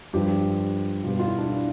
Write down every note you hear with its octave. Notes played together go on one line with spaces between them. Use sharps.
G2 F3 G4
B2 G3 F4
F4
E4
D4
E4